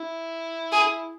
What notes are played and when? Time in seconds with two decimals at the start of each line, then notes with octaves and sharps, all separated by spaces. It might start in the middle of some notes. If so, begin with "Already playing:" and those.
Already playing: E4
0.72 G#4